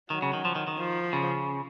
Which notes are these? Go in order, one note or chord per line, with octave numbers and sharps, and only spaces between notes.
D#3 F#3
C#3
D#3
F3
D#3
D#3
F3
C#3